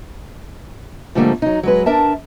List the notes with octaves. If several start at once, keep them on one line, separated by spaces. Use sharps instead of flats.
G#2 D3 F3 G3 A3 A#3
F#3 D#4
F#3 G#3 B4
D4 A#4 E5 A5